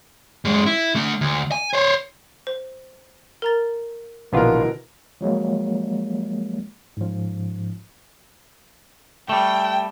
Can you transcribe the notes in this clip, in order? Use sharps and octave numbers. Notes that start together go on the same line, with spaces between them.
F#2 G#3
E4
A3 D4
D2
G#5
C5 C#5
C5
A#4 A#5 A6
A#1 B2 D3 E3 B3 F4 A#4
F3 F#3 G#3 A#3
G#2 F3
G3 A3 G5